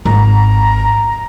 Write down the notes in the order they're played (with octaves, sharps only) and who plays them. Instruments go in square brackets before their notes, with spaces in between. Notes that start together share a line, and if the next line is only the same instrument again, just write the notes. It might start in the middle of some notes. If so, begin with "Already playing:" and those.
[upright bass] G#1 [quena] A#5